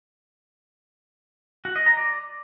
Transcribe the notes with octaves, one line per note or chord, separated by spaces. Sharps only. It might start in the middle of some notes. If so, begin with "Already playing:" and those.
F#4
D#5
A#5
D5